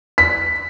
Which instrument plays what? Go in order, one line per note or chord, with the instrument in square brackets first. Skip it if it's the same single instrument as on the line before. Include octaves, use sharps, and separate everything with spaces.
[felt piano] B6